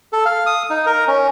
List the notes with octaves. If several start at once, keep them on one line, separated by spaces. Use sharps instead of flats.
A4
F5
D#6
D#4
A#4
C#4